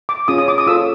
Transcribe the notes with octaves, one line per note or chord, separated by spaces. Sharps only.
D6
C#4 F4 G#4 D#6
D#6
D6
D#6
F4 A4 C#5 E6